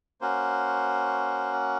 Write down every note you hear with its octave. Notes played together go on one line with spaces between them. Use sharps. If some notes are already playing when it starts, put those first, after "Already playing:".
A#3 C#4 F#4 C5